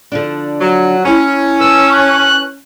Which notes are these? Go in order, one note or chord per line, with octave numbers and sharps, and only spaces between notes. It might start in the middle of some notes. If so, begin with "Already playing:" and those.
D3 F3 D4
F#3
C#4 E4 A#5
B4 A5 E6
F#6